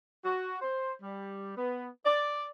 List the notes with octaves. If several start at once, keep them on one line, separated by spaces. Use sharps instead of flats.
F#4
C5
G3
B3
D5